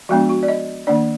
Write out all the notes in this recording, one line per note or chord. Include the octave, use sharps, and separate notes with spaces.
F3 G#3 B3 D4 F#4
F#4
D5
D#5
D#3 A#3 D4 D5